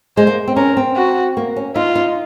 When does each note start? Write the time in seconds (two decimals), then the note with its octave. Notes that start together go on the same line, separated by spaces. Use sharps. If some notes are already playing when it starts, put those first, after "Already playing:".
0.17 G#3 C5
0.27 A#3
0.48 C4
0.56 C#4 A#4
0.77 C4
0.96 F#4
1.37 A#3
1.56 C#4
1.76 D#4 F4
1.95 D#4